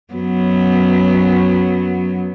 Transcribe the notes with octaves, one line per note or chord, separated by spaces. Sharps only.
F#2 F#3 B3